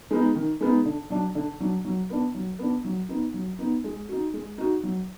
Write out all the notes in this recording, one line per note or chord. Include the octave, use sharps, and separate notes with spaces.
G#3 B3 D#4
D#3
G#3 B3 D#4
D3
F#3 D4
D3
F#3 D4
F#3
B3 D4
F#3
B3 D4
F#3
B3 D#4
F#3
B3 D#4
G#3
D#4 F#4
G#3
D#4 F#4
F#3